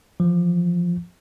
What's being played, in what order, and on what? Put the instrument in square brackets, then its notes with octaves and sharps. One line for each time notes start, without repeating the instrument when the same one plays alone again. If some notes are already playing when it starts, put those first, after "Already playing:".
[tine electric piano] E3 F3